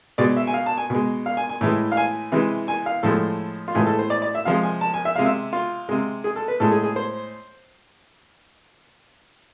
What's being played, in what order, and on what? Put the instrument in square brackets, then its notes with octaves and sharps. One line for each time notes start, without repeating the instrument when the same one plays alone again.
[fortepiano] B2 G#3 D5
E5
G#5
F5
A5
G#5
B2 G#3
F5
G#5
G#5
A2 E3 G#3
F5
G#5
C3 E3 G#3
G#5
F5
A2 F3 G#3 A4
F4
A2 E3 G#3 G#4
A4
C5
D5
D5
E5
C3 F3 G#3 F5
G#5
A5
G#5
E5
C3 G#3 F5
E5
F4
C3 G#3
G#4
A4
B4
A2 G#3 A4
G#4
G#4
C5